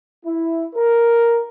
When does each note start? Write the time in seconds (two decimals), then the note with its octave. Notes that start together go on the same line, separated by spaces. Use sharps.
0.24 E4
0.75 A#4